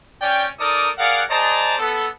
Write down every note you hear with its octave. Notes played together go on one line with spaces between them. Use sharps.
C#4 D5 G5
D#4 A4 A#4 D5 D6 D#6
G#4 A#4 D5 F5 F#5
G#4 C5 D5 D#5 A5 A#5
B3 A4